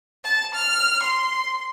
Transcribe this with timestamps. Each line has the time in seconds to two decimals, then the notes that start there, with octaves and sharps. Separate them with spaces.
0.24 A5
0.55 F6
1.02 C6